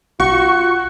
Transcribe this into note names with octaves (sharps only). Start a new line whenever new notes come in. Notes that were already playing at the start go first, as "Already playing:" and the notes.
B1 F4 F#4 C#6